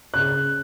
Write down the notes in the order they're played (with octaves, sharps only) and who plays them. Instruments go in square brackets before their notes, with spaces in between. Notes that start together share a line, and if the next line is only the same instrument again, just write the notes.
[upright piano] C#3 F#6